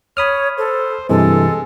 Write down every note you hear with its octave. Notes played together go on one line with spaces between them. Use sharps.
C#5 B5 D#6 F6
A4 C5
G2 C3 E3 G#3 A4